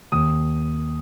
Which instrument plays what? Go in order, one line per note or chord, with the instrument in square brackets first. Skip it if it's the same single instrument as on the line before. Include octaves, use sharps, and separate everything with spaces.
[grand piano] D#2 D#6